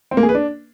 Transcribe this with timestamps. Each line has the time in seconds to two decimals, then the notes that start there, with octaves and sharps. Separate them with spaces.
0.11 C4
0.17 A#3
0.23 G#4
0.29 B4
0.35 D4